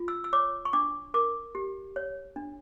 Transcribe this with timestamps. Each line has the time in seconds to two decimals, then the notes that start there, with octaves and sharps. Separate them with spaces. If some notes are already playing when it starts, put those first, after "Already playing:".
Already playing: F4
0.08 E6
0.24 E6
0.33 C#5 D6
0.65 C#6
0.73 D4 D6
1.14 A#4 D6
1.55 G4
1.96 C#5
2.36 D4